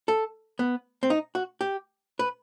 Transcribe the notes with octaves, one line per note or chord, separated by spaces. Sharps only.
A4
B3
C4
D#4
F#4
G4
B4